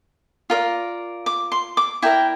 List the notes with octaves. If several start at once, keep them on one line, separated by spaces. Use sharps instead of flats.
F4 A#4 D5
D6
C6
D6
E4 A#4 D5 G5